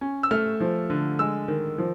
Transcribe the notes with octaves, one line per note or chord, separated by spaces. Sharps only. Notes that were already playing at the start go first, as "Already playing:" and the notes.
C#4
E6
A3 F6
F3
D3
G#3 E6
D#3
F3